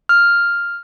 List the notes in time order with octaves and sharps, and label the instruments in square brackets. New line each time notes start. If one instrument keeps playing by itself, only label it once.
[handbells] F6